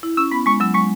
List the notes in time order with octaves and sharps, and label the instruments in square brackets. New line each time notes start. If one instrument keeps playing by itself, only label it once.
[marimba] E4
[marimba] C#4 [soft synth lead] E6
[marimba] B3 [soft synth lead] B5
[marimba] G#3 [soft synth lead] C#6
[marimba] F#3 [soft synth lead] E6
[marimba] G#3 [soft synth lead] C#6